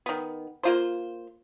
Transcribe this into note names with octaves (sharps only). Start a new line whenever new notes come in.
D#3 B3
A#3 F4 C5